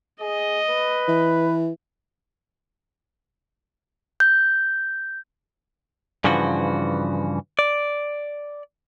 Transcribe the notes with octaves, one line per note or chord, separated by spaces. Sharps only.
G#4 D#5
B4
E3
G6
G2 C#3 E3 F3 F#4
D5